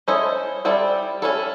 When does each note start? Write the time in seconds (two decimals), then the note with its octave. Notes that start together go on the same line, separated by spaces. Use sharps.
0.08 C#4 E4 A4 C5 D#5
0.65 G3 C4 E4 A4 D5
1.22 C#4 E4 A4